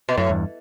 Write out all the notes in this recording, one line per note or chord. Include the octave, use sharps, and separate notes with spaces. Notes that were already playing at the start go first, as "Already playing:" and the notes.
B2
F#2 A2
E2 G2